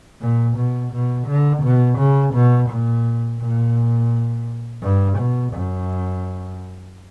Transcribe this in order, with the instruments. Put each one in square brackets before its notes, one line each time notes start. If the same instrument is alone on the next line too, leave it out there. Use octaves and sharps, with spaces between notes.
[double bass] A#2
B2
B2
D3
B2
C#3
B2
A#2
A#2
G2
B2
F#2